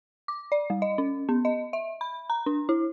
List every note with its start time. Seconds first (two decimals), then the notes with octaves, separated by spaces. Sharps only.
0.28 D6
0.52 D5
0.70 G3
0.82 D#5
0.98 C#4
1.29 B3
1.45 D#5
1.73 E5
2.01 B5
2.30 A#5
2.46 D4
2.69 E4